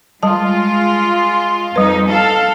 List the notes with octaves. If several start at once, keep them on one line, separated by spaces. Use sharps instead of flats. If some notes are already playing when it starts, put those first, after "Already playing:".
G3 G#3 F4 A5
F2 G3 D#4 B4
A4 F5